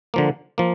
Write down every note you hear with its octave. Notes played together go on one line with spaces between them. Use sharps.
D3 F3 A#3
F3 A#3